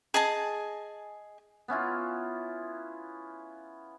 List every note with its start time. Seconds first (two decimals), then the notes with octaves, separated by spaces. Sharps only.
0.14 G#4 D#5 G#5 A5
1.68 B3 C#4 E4 F4